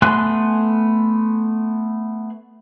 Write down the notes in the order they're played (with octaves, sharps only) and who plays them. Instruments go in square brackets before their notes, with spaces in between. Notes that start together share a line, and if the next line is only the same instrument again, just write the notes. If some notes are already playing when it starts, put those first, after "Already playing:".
[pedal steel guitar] A3 B3 G#5 C6 F#6